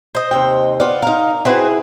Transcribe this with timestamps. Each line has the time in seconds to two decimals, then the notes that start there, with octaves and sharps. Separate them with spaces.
0.15 C5 D#5
0.31 D#2 C3 G5
0.80 B3 F4 D5
1.02 D#4 A#4 F5
1.45 C4 E4 F#4 G#4 B4